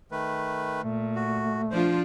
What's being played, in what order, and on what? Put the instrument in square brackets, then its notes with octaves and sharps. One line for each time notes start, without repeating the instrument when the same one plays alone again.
[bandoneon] D#3 A3 B4
[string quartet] A#2 [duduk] A3
[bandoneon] F#4
[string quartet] F3 [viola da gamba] D4 F4 [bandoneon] C5